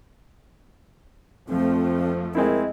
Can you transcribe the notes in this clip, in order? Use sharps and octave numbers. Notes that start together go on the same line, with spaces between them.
F2 F3 A3 C4
G#3 C4 E4 A#4